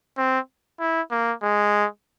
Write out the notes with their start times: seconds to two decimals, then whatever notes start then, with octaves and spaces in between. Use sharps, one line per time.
0.18 C4
0.80 E4
1.11 A#3
1.43 G#3